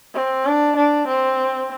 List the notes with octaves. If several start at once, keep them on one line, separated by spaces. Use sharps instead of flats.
C4
D4
D4
C4